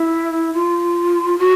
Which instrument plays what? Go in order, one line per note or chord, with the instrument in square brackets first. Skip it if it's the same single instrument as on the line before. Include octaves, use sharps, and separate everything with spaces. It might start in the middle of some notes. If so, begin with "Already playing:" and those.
Already playing: [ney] E4
F4
F#4